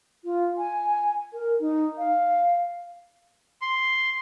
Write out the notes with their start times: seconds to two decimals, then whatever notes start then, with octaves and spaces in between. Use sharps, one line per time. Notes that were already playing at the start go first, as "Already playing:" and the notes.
0.24 F4
0.58 G#5
1.33 A#4
1.60 D#4
1.98 F5
3.62 C6